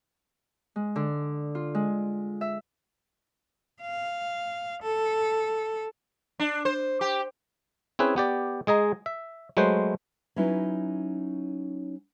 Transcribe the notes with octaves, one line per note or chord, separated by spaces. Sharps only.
G#3
D3
F4
G#3
E5
F5
A4
D4
C5
G4
C4 C#4 E4 G#4 B4
B3 G4 D5
G#3 G#4 D#5 A#5
E5
F#3 G#3 A3 B4 C5
F#3 C#4 D#4 E4 F#4 B4